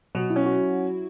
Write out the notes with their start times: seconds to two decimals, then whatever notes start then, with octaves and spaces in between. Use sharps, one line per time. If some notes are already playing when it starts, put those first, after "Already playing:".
0.15 B2 F#3
0.30 E4
0.36 C#4
0.46 F#4